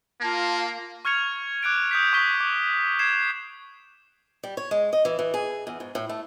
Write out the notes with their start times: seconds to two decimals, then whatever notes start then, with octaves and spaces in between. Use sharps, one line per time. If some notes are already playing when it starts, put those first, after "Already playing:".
0.21 A#3 F4 A5
1.05 C#6 F6 G#6 C#7 F7
1.63 D6 F#6 G#6 D7
1.91 D#6 G6 B6
2.13 C#6 B6 G7
2.41 D6
2.99 G#6 C7 E7
4.43 G3
4.57 C#5
4.71 G#3
4.93 D#5
5.05 E3
5.19 E3
5.34 G#4
5.67 E2
5.80 G#2
5.95 A2
6.09 A3